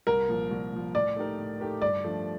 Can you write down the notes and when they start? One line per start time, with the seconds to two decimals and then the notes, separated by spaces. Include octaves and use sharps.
0.07 C2 A#4
0.29 A#2 F3
0.51 C2
0.72 A#2 F3
0.95 A2 D5
1.16 A3 D#4 G4 A#4
1.38 A2
1.60 A3 D#4 G4 A#4
1.82 G2 D5
2.04 F3 A3 D4